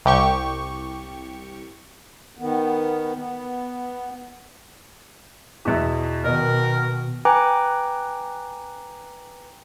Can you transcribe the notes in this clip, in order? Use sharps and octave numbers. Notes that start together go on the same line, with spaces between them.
C2 G4 C#6
D#3 B3
B3
E2 B2 E5
B2 D#3 A#4 D#5
B4 G5 G#5 A#5 D6 F#6